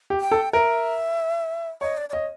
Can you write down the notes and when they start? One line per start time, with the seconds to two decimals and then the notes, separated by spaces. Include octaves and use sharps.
0.10 G4
0.20 G5
0.31 A4
0.53 A#4 E5
1.81 C#5 D#5
1.97 D5
2.09 D5
2.12 C#5 D#5